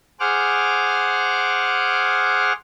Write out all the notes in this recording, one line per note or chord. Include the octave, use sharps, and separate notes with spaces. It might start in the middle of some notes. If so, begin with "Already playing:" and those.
G#4 C5 F#5 D6 F6